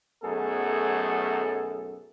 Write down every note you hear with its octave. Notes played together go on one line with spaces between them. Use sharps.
B1 F#2 A3 B3 G#4 A4